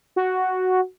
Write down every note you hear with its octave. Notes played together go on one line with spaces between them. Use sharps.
F#4